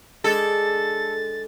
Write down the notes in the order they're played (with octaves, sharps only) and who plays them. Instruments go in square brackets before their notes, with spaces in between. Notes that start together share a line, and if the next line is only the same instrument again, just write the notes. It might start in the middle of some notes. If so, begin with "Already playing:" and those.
[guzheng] G#3 D4 [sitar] A4 [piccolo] A6